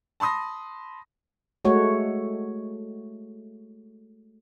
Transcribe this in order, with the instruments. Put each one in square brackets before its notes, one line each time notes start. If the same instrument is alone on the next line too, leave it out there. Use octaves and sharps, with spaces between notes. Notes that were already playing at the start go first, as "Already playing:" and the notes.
[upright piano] A5 B5 C6 D#6 A#6
[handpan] G#3 A3 F#4 C#5